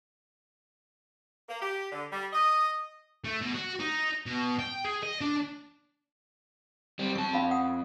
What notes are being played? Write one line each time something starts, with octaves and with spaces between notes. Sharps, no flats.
A#3
G4
D3
G3
D#5
A3
B2
F#4
D#4
B2
G5
G#4
D#5
D4
G3 C4
F2 A5 C#6
C#4 F5 B5
F#5 D#6